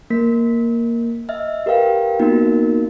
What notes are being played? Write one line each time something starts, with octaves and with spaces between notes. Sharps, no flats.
A#3 A#4 B6
D#5 E5 F6
G4 A#4 B4 F5 G5
A#3 B3 D#4 F4 F#4 A#4